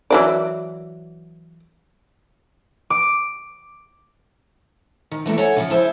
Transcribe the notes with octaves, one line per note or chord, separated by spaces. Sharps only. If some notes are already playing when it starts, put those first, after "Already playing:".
E3 F#3 D5
D6
D#3
E3 A3 A#3 E4
A4 C#5 F#5 G#5
C#3 E3 F3
E4 G#4 A4 C5 E5